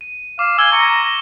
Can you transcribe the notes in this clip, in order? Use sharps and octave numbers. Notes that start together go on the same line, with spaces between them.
D#7
F5 D6
G#5 E6 F6 G7
A#5 C#6 C#7 D#7